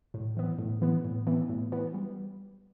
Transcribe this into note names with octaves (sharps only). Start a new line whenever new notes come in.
A2
E3 B3
A2
E3 B3
A2
E3 B3
A2
E3 B3
G3